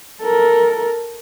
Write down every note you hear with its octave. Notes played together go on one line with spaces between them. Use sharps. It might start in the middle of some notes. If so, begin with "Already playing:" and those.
A4 A#4